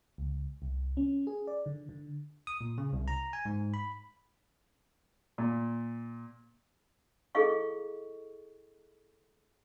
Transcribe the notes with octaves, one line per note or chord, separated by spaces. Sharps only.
C#2
C2
C#4
G#4
D5
D3
D3
D#6
A#2
C#3
C2
A#5
G#5
G#2
B5
A#2
E4 G#4 A4 D#5 F5 C#6